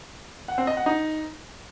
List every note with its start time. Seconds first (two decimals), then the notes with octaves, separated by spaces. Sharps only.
0.48 F#5
0.58 C4
0.67 D#5
0.77 F#5
0.86 D#4